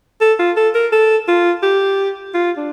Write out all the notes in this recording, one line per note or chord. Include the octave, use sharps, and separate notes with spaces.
A4
F4
A4
A#4
A4
F4
G4
F4
D4